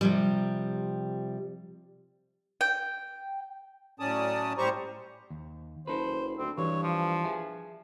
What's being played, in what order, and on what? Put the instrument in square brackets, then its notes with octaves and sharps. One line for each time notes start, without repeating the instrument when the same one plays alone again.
[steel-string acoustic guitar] C3 F3 G3
[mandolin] G5
[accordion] A2 F#3 C#4 D5 A5 D#6
A2 G3 G4 C5 A#5 C#6
[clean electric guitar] D#2
[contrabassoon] F#1 [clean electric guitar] A4 B4 [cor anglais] C5
[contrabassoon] D2 [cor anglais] C4
[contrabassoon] G2 [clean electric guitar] E3 [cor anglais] C#5
[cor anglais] F3
[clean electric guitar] G#4 E5 G#5